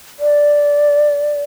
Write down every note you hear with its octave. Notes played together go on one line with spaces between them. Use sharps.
D5